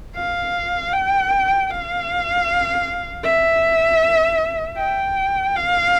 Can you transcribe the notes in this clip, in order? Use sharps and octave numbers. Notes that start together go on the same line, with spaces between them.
F5
G5
F5
E5
G5
F5